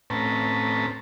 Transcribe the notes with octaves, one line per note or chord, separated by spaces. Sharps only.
A2 C4 C#4 B4 A5 A#5